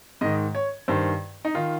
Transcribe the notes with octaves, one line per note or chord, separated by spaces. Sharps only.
G#2 D#3 D#5
C#5
G2 D#3 C5
D#4
D#3 F4